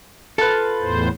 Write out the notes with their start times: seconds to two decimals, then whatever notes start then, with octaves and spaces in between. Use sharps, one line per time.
0.38 F4 A4 B4
0.81 E2 A2 C5